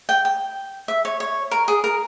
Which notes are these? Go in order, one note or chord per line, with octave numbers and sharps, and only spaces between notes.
G5
G5
E5
C#5
C#5
A#4
G#4
A#4